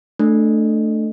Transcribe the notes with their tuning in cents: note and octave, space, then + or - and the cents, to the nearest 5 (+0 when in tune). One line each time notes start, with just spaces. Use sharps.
A3 +0 D4 +15 A4 +0